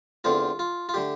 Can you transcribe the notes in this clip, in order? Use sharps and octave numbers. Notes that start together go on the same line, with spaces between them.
E2 D3 A3 C4 F4
F4
F4
D3 A3 G4